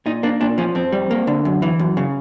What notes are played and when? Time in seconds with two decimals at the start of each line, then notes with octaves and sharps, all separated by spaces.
0.06 A#2 D#4
0.23 A#3 D4
0.41 A#2 D4
0.58 F3 C#4
0.75 F2 C4
0.92 G3
1.11 A#3
1.27 D3
1.45 F#2
1.62 E3
1.79 F#2
1.97 C#3